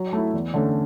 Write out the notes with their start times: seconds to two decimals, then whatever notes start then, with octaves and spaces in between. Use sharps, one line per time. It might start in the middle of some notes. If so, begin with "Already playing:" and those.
Already playing: F#3
0.13 A3 E4
0.33 E2
0.54 D3 A3 C#4